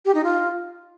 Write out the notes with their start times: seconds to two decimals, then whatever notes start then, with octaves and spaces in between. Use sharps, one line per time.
0.05 G4
0.15 D#4
0.24 F4